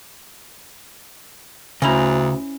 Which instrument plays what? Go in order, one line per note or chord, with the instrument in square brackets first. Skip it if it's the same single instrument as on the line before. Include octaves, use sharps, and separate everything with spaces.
[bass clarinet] D2 [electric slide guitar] C#3 A#5 [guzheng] C#4 E4 C5